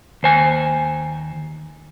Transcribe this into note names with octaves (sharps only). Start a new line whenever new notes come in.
D#2 C5 G#5